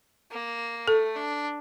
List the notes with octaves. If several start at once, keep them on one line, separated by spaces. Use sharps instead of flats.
A#3
A3 A4
D4